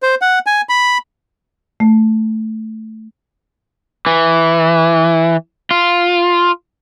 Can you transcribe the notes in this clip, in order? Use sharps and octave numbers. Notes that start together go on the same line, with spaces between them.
C5
F#5
G#5
B5
A3
E3
F4